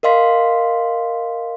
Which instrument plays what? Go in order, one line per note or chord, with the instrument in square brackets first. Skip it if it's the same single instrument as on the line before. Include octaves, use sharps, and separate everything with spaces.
[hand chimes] A#4 D#5 F5 C6 B6